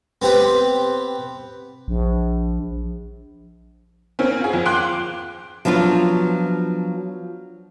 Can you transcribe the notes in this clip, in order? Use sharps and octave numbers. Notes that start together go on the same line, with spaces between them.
B3 C4 G4 B4
A#1
A#3 C4 C#4
F4 G#4
F2
F5 G5 C6 D6 F#6
F3 F#3 B3 D4 F4